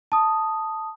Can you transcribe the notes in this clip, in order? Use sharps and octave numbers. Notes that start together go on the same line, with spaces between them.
A5 D#6